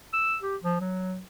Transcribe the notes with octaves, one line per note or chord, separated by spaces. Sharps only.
E6
G4
F3
F#3